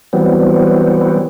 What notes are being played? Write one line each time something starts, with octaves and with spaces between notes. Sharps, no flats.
E3 F#3 G3 B3 C4